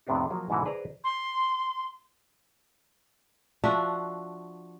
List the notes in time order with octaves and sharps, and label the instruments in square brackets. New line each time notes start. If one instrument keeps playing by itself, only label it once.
[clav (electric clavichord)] F2 A2 C3 B3 D4 D#4
F3 F#3 A#3
G#2 B2 D3 E3 E4 F#4
G#4 B4 C5 D5 D#5 A#5
[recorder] C6
[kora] F3 D4 F#4 E5